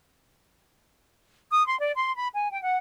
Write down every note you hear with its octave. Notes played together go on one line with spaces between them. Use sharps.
D#6
C6
D5
C6
B5
G#5
G5
F#5